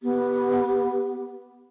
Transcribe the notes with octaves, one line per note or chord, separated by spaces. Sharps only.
B3 G4